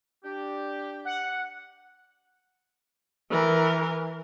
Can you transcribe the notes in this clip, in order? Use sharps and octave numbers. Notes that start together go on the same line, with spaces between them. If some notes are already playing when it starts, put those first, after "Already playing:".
D4 G4
F#5
E3 A#4